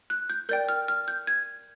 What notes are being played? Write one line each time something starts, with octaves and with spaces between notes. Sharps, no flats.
F#6
G6
A#4 D5 G5 G6
F6
F6
G6
G#6